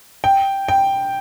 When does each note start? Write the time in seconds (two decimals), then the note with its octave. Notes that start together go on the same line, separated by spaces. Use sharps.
0.24 G5
0.68 G5